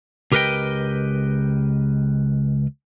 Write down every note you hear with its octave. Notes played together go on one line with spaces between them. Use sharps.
C#2 G4 A#4 B4 D#5 G5